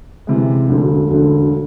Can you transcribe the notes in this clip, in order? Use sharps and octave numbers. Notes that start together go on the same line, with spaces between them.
C3 E3 G#3
E1 D2 D3
E1 D2 D3